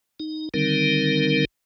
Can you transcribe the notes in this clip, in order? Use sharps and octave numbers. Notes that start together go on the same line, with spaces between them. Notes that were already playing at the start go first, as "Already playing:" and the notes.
D#4
D3 D#3 G3 C4 D#4 A#4